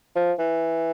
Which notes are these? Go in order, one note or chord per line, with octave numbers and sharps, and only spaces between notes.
F3
E3